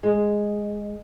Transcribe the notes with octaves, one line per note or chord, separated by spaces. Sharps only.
G#3